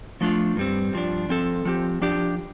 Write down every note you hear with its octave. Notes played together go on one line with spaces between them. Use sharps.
F3 A3 D4 F4
G2 G3 C4
G2 F3 D4
F3 C4 A4
F3 C4 G4
F3 D4 G4